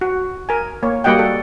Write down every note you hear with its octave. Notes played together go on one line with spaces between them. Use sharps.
F#4
A#4 G#5
A#3 C#5
G3 A#3 F#4 D#5 F#5 G5
A4